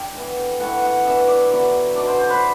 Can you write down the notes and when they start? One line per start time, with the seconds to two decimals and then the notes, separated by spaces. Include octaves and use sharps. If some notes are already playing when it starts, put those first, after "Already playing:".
Already playing: D4 G5
0.14 A2 E3 B3
0.59 E3 A3 E4 F#5
0.82 F#5
1.04 E3 B3 D4 E5
1.28 D5
1.50 D3 F#3 B3 D4 D5
1.96 B2 F#3 A3 D4 D5
2.07 C5
2.18 C5
2.30 B4